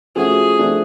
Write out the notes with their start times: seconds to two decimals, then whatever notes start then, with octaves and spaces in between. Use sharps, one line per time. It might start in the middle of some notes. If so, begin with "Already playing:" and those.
0.16 F3 A3 C#4 F#4 G#4
0.59 F3 A3 D4